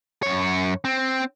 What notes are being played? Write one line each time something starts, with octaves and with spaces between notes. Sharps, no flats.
F#2 C#5
C4